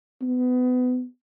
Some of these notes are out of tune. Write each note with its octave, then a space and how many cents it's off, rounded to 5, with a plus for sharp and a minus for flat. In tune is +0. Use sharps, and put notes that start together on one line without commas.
B3 +25